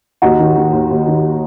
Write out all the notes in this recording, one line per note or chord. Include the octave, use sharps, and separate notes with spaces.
D#2 D#4 F#4
D#3
D#3
D#2
D#2
D#3